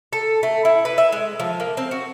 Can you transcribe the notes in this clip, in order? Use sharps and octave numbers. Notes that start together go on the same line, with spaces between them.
A4
A3
E4
B4
E5
G#3
F3
A#3
C4
F#4